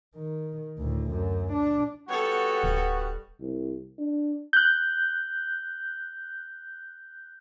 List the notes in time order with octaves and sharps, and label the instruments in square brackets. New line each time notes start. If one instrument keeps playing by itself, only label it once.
[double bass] D#3
D2 A2
F#2
D4
[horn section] G3 B3 F#4 [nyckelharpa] A4 C#5
[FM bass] D1
[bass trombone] C2
D4
[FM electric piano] F#6 G6